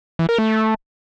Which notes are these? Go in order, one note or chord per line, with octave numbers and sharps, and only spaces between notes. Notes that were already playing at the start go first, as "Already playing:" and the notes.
E3
A#4
A3